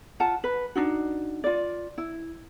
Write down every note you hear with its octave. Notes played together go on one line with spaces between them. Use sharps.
F4 F#5 A5
B4
D4 D#4 F#4
F4 D5
E4